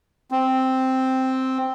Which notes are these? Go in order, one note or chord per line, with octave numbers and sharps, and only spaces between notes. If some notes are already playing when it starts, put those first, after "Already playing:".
C4